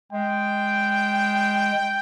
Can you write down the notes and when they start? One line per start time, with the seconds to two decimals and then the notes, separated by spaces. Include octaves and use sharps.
0.12 G#3 G5
1.73 G#3